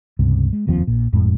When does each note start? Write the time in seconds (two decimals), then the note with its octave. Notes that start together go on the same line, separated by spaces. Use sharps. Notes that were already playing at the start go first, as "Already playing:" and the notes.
0.19 C#2 G2 C3
0.53 G#3
0.67 F1 D#2 F3 C4
0.87 A#1 A#2
1.13 G1 F2 A2 G#3